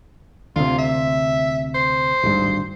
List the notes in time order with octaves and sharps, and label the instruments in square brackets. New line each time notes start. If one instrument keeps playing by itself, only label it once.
[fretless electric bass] D2 C3 [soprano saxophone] F4
[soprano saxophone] E5
C5
[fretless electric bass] D1 G#1 G2